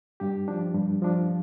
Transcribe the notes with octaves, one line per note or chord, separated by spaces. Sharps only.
G2 G4
F3 D4
G2
F3 D4